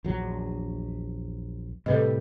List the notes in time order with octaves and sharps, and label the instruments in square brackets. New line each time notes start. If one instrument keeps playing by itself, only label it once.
[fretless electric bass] A#1 E2 F#3
[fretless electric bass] A2 C3 G3 [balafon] A4 B4 D#5